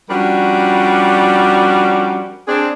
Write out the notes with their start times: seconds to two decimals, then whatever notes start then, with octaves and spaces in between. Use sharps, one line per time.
0.10 F3 G3 C#4 D4 F#4 A#4
2.48 C4 D4 G#4